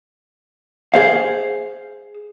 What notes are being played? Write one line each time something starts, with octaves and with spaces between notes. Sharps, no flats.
G#4 C5 F5